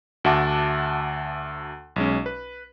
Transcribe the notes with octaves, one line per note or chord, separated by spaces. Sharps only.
D2 F#4 E5 F#5 A5 D6
B1 G#3 C#4
B4